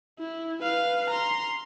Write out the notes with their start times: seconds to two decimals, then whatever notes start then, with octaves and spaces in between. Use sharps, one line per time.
0.19 E4
0.62 B4 F5
1.10 A#5 C6